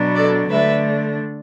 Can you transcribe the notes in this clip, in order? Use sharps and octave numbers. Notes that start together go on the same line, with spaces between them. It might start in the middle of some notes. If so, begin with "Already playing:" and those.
Already playing: B2 F#3 B3 D4
A4 D5
D3 A3 D4 B4 E5